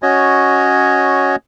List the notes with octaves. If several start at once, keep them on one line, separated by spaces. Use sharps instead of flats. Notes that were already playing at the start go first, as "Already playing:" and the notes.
C#4 F#4 C#5 D#5